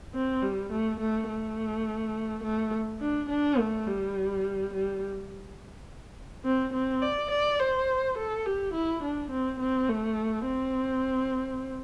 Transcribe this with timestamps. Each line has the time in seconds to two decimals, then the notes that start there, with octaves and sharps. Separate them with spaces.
0.14 C4
0.42 G3
0.72 A3
1.00 A3
1.29 A3
2.43 A3
3.01 D4
3.29 D4
3.59 A3
3.87 G3
4.73 G3
6.45 C4
6.73 C4
7.02 D5
7.30 D5
7.60 C5
8.17 A4
8.46 G4
8.73 E4
9.03 D4
9.31 C4
9.60 C4
9.89 A3
10.46 C4